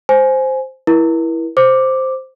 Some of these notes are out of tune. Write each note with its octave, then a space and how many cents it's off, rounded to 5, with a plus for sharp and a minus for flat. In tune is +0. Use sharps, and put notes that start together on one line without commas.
C5 +0 G#5 +15
E4 +0 A#4 +40
C5 +0 D6 +0